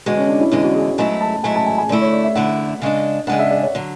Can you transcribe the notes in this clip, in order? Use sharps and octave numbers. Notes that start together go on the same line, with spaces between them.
E2 D3 G#3 F#4
C#4
D4
E4
E2 D3 G#3 E4
F#4
G#4
G#2 F#3 A3 E4 G#5
A5
G#2 F#3 A3 E4 G#5
A5
G#5
G#5
D3 A3 E4 D5
C#5
D5
E5
D3 A3 E4 F#5
C#3 G#3 D4
C#3 G#3 D4 F#5
E5
D5
C#5
D3 F#3